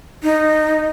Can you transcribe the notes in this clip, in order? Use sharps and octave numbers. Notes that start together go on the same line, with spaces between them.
D#4